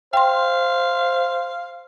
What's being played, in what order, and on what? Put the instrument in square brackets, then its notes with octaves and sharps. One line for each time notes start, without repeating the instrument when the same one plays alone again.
[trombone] C5 [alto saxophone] F5 [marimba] G5 C6